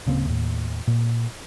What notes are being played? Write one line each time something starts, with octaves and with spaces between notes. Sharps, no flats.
D1 C#3 A#3 C4
D#2 A2
A#2